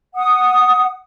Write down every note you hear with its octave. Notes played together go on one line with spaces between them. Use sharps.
F#5 D#6